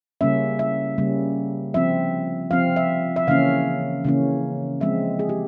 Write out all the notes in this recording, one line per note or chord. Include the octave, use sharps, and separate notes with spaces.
C#3 G3 A#3 C#4 E5
E5
C#3 G3 A#3 C#4
F3 C4 E5
F3 C4 F5
E5
E5
C#3 E3 A#3 C#4 F5
C#3 E3 A#3 C#4
F3 G#3 C4 E5
G#4
G4